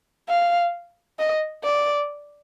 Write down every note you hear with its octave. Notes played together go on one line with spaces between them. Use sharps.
F5
D#5
D5